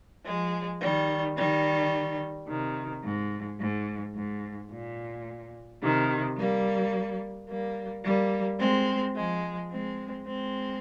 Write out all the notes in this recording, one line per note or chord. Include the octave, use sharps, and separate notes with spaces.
F3 G#3
D#3 G3
D#3 G3
C3 D#3
G#2
G#2
G#2
A#2
C3 D#3
G3 A#3
G3 A#3
G3 A#3
G#3 C4
F3 G#3
G#3 C4
G#3 C4